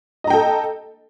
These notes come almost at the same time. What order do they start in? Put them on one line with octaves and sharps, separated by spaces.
D#5 A#5 G5 A4